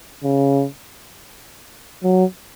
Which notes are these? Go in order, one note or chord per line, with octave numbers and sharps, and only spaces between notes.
C#3
F#3